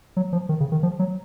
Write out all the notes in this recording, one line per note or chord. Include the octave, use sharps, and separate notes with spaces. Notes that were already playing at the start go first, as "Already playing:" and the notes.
F#3
F3
D#3
C#3
D#3
F3
F#3